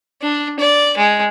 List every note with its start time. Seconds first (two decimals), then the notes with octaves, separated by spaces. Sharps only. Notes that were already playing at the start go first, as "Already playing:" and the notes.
0.22 D4
0.60 D5
0.97 G#3